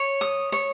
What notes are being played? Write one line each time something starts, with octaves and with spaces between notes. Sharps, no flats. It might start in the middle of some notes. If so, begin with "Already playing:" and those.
Already playing: C#5
D#6
C#5